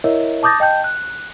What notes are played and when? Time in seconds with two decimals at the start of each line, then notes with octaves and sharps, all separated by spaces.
0.04 E4 A#4 C#5 D#5 E5
0.43 A5 D6 D#6 G6 A6 A#6
0.60 D#5 G5 A5 G6
0.84 F#6